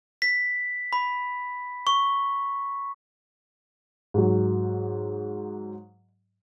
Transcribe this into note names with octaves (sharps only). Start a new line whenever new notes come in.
B6
B5
C#6
G#2 F#3